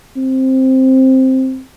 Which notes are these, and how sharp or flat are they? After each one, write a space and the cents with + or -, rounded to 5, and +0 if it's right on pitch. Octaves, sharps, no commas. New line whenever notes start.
C4 +5